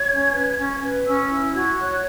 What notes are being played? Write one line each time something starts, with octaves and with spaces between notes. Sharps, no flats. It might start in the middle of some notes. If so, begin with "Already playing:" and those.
Already playing: C#5 G#6
C#4
B4
C#4
B4
C#4 E6
E4 E6
F#4 G#6
C#5 F#6
F#6